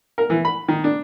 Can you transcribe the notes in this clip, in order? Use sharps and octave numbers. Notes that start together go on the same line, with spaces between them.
A#4
E3
B5
D#3
D4